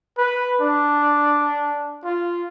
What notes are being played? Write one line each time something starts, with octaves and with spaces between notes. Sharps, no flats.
B4
D4
F4